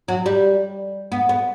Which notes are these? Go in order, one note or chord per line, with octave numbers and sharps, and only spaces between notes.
F#3
G3
B3
B3